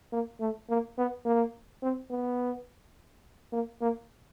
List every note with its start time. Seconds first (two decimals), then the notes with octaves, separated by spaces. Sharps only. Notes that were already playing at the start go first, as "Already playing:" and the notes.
0.12 A#3
0.40 A3
0.70 A#3
0.98 B3
1.25 A#3
1.83 C4
2.10 B3
3.52 A#3
3.81 A#3